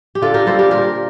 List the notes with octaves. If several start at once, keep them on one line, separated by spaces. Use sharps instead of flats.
G4
D3 F4 A4
G4 A#4
G3 A#3 A4 C5
G4 A#4
A#2 G4 A#4